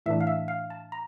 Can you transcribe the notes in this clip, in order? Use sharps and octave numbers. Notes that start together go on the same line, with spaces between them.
A2 E3 A3 D4 E5
F5
E5
F5
A5
A#5